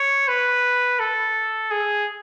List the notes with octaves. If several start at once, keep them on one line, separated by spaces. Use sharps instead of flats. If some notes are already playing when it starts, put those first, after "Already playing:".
Already playing: C#5
B4
A4
G#4